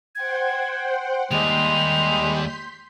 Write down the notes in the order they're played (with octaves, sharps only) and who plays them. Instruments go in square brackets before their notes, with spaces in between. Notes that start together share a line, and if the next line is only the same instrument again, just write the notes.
[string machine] C5 F#5 G5 [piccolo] G#6
[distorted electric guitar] D#2 [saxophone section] G3 G#3 [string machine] C6 G6 B6 [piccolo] F7